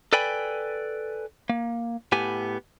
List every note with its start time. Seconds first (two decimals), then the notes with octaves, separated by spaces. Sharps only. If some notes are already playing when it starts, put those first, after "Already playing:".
0.13 A4 B4 D5 G5 G#5 B5
1.50 A#3
2.12 A2 B3 G4 G#5